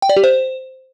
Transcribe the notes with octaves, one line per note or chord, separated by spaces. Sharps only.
G5
D5
G4
C5